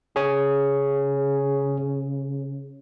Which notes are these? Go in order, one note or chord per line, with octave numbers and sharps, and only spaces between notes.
C#3 G#4 C#5 G#5